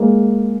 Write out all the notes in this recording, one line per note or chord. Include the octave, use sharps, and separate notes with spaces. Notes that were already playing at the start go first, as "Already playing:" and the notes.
Already playing: G#3 A#3